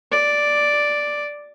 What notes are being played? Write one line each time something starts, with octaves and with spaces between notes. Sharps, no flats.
D5